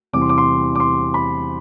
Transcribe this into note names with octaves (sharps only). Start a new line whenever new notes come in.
E2 C3 G3 C4 D6
C6
D6
C6
D6
C6
B5